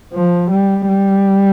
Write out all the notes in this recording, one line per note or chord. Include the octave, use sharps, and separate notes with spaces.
F3
G3
G3